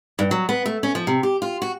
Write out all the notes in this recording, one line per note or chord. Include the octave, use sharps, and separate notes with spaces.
G2
F#3
B3
A3
C#4
F3
C3
G4
F4
F#4